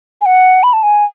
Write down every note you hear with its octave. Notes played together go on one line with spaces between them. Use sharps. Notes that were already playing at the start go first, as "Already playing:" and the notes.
G#5
F#5
B5
A5
G#5